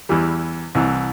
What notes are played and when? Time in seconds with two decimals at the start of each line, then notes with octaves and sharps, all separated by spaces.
0.09 E2 E3 G3
0.75 C2 C3 E3